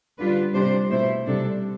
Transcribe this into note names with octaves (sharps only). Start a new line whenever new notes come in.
D3 G3 D4 F4 B4
C3 G3 D4 C5
B2 A3 E4 C5
C3 G3 D4 A4